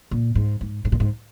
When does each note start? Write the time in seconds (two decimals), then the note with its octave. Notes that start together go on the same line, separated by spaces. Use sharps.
0.11 A#2
0.35 G#2
0.61 G#2
0.85 G#2
0.92 A#2
1.00 G#2